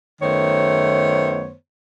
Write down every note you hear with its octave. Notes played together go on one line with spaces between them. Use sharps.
F#2 D#3 A3 B3 C5 C#5